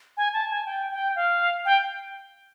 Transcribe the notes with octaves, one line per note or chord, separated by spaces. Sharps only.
G#5
A5
G#5
G5
G5
F5
G5